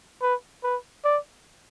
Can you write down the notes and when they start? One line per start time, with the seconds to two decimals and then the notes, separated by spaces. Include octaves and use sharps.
0.22 B4
0.63 B4
1.05 D5